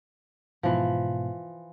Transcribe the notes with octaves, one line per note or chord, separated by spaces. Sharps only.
G#2 B2 E3 F3